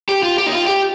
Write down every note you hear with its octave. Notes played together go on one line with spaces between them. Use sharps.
G4
F4
G4
D#4
F4
G4